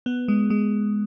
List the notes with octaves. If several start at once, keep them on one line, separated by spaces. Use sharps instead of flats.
B3
G#3
G#3